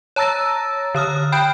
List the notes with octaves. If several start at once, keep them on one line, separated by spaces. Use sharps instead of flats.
C#5 A5 A#5 E6 A6 A#6
D3 C#5 D#6 F6
G5 B5 F#6 G6 D7